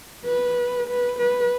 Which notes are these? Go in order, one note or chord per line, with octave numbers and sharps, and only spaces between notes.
B4
B4
B4